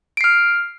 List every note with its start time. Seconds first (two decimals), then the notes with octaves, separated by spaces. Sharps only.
0.17 D7
0.21 C7
0.24 F6